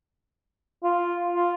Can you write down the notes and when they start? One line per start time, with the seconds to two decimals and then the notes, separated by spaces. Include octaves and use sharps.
0.84 F4
1.33 F4